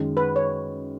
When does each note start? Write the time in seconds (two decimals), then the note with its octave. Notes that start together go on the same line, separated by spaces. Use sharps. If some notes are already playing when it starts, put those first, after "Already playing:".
Already playing: F#2 D#3 G#3
0.17 B4
0.36 C#5